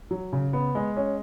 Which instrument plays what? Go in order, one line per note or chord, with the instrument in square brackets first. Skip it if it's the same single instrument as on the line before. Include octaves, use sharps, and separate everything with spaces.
[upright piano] F#3
C#3
B3
G#3
C#4